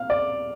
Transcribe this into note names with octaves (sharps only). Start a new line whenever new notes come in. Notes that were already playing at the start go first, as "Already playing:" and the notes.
Already playing: F5
D5